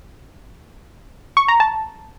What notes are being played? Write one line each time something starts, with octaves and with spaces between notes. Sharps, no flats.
C#6
A#5
A5